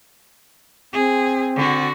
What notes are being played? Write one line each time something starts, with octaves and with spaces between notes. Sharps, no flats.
C4 G#4
D3 F#4